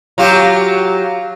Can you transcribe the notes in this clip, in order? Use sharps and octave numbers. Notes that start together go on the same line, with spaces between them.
F#3 F4 G4